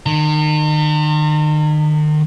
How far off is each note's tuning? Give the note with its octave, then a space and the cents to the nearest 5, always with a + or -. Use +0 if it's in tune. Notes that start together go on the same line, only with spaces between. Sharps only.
D#3 -35 A#5 -45